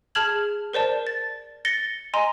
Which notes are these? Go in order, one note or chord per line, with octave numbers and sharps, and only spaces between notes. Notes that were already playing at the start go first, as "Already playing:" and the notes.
G#4 A5 F6 G#6 F#7
A#4 C5 D5 A5
A6
A6 A#6 C#7 G7
D#5 G#5 A#5 C6